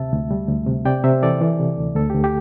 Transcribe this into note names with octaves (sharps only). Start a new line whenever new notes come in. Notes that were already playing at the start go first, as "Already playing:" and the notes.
Already playing: D2 C3 E5 A5
D2
G3
D2
C3
C3 D5 G5
C3 C5 E5
E3 A4 D5
E3
C3
D2
D2 A4
G4
D2
G4